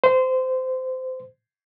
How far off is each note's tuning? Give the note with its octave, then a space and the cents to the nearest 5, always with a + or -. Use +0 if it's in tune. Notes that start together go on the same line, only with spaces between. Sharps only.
C5 -20